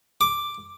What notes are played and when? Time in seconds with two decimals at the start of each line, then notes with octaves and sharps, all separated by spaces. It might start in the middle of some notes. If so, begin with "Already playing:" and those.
0.21 D6